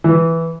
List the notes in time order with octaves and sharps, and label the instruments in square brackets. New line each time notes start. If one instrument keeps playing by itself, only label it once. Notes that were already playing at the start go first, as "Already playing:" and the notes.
[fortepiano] E3